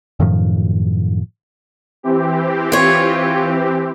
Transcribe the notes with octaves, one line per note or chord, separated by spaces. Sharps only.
F#2 A2 D#3 F3
E3 C4 G4
F4 C#5